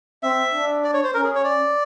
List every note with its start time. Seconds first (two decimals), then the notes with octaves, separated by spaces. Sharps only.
0.23 C4 E5
0.54 D4
0.84 D5
0.94 C#5
1.04 C5
1.14 C#4 A#4
1.24 G#4
1.35 C#5
1.44 D5